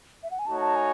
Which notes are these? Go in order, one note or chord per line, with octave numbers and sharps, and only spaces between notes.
E5
F#5
G#5
A3 D#4 F#4 C#5 A5
A5
G#5